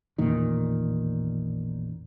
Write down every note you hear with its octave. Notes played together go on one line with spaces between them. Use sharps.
A1 E2 A#2 D#3